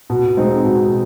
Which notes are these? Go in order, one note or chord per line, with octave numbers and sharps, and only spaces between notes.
B2
G#3 C4 D#4
B2